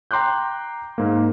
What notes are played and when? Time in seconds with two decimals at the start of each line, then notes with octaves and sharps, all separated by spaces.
0.11 G5 A#5 C6 D6 F#6 G6
0.98 G#2 A#3